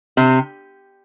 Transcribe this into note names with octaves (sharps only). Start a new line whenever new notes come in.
C3